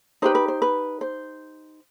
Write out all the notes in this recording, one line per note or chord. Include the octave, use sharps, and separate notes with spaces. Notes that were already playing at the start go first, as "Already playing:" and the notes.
D#4 G4 B4 C5
B4
C5
B4
C5